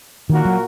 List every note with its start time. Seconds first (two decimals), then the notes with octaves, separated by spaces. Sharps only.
0.30 A#2 D#3 A#3 F#4 A#4
0.45 F#3